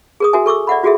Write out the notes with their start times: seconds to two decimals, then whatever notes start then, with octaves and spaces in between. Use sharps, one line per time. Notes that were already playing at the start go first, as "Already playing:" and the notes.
0.20 G#4 A#4 D#6
0.33 F#4 A#4 E5 G#5
0.46 A4 C#6 D6 E6
0.67 D5 E5 F#5 B5
0.83 F4 F#4 G#4 A4 E5